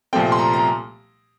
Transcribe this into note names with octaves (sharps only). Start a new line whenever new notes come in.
C2 A#2 F3 A3 C4 G5
C6
A#5
A#5